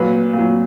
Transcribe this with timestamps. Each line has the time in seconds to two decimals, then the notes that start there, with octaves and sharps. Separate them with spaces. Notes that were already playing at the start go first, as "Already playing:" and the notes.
Already playing: A#2 F#3 B4
0.33 A#2 F#3